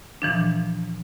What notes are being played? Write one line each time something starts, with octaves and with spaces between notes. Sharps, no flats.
A#2 E3 F3 D4